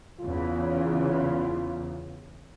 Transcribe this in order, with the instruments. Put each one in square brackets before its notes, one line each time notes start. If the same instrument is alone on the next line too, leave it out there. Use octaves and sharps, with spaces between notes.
[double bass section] E2 C#3 [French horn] F4